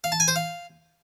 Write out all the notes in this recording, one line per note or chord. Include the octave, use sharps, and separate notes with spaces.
F5
A5
G#5
C5
F5